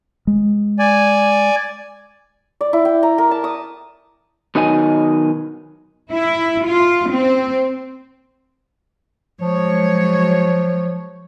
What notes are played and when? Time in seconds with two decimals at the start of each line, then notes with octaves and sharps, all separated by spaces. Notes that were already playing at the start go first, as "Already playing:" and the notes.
0.27 G#3
0.79 D5 G#5
2.61 D5
2.73 E4
2.85 G5
3.03 A#5
3.18 A#4
3.31 A5
3.44 D#6
4.55 B2 D#3 F#3 D#4 D#5 G#5
6.11 E4
6.66 F4
7.10 C4
9.41 F3 F#3 G#3 C#5